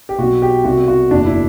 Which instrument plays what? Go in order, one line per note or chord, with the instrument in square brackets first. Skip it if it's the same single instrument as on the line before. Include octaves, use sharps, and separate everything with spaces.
[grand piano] G4
B1 B2 F#4
G4
C2 B2 F#4
F#4
F#1 E2 B2 D4
E4